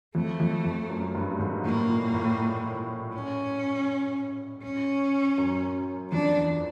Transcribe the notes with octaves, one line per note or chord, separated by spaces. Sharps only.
F2 A3
F2
F2
F#2
G2
G#2
A2 A#3
A#2
A2
C#4
C#4
F#2
F2 D4
E2